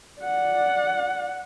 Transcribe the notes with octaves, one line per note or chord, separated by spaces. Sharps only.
D5 F#5